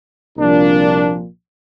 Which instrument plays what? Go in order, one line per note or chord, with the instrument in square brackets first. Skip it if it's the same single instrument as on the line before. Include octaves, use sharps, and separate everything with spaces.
[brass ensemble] C2 A#2 F3 A#3 D4